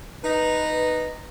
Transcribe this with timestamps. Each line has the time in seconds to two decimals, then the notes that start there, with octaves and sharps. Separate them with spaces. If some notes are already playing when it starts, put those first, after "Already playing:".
0.23 D#4 B4